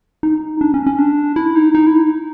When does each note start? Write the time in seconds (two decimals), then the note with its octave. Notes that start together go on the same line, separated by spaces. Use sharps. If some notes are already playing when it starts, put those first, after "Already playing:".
0.23 D#4
0.61 D4
0.74 C#4
0.87 C#4
0.98 D4
1.36 E4
1.55 D#4
1.75 D#4
1.87 E4
1.99 D#4